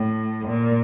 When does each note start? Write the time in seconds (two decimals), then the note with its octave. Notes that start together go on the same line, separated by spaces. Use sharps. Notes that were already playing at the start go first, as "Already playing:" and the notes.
Already playing: A2
0.48 A#2